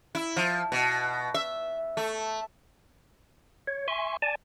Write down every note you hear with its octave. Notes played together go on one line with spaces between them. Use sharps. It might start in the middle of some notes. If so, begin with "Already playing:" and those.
E4
F3
B2
E5
A3
C#5
E5 G#5 C6 C#6
D5 G#5 A5